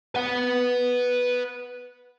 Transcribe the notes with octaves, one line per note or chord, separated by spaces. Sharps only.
B4 F#5